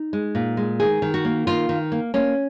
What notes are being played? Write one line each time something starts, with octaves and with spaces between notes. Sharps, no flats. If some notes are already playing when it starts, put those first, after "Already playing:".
Already playing: D#4
G#3
A#2
G#3
D#3 G#4
D#3
F#4
A#3
D#3 F4
D#3
A#3
A#3 C#4